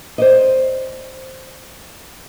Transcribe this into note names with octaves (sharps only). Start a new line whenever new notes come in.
C5 D5 D#5